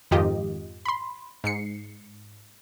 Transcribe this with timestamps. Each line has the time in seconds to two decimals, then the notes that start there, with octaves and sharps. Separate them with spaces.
0.11 F2 G#2 D#3 F4 G4 D#5
0.85 B5 C6
1.44 G#2 C7 C#7